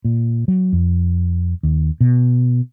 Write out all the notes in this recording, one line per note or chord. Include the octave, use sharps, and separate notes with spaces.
A#2
F#3
F2
D#2
B2